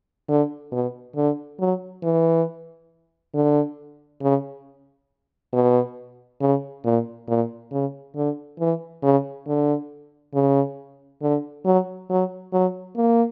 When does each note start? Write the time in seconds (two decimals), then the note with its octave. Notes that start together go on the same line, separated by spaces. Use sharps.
0.28 D3
0.72 B2
1.16 D3
1.60 F#3
2.03 E3
3.34 D3
4.22 C#3
5.53 B2
6.41 C#3
6.84 A#2
7.28 A#2
7.72 C#3
8.16 D3
8.59 E3
9.03 C#3
9.47 D3
10.34 C#3
11.22 D3
11.65 F#3
12.10 F#3
12.53 F#3
12.96 A#3